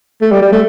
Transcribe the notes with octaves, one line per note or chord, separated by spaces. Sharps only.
A3
G3
G3
A3